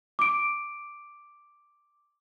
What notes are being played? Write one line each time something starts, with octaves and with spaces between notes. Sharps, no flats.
D6 D7